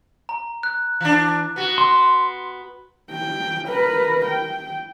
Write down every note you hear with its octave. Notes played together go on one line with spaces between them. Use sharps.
A#5
F#6
E3 D4
B3 F#4
C6
G5
A#4 B4
G5